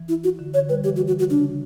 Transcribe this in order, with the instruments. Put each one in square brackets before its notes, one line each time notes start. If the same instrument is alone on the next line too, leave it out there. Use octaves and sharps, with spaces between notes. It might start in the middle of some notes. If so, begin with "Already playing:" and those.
Already playing: [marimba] E3
[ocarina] E4
F#4
[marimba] D3
[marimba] D3 [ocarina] C#5
[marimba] G3 [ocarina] B4
[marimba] E3 [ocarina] G4
[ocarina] F#4
F#4
F#4
[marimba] C#3 [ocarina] D4